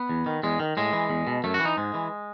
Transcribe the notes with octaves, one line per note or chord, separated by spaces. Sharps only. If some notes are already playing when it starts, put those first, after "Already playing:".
Already playing: B3
E2
D#3
E2 G#3
D#3
A2 G#3
E3
E2
B2
F#2 A3
F#4
E3
D#4
G#2 G#3
E3